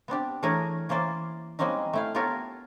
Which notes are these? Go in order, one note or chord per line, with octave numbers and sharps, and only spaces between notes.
B3 C4 D4 G4
E3 A3 D4 G#4 A#4 C#5
E3 A#3 C#4 C5 D5
G3 G#3 A#3 C4 C#4 D#4
A3 E4 F5
B3 F4 G4 A4 A#4 C#5